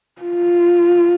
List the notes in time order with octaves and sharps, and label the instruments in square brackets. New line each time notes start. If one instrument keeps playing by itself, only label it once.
[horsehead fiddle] F4